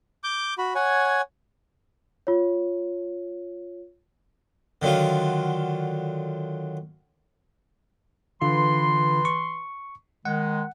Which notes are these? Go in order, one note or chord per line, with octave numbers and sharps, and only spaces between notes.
D6 G6
F#4 B5
C#5 F#5 G#5
F4 C#5
D3 D#3 F#3 F4
D3 E3 F4 B4 C6
C#6
D#3 G#3 F#5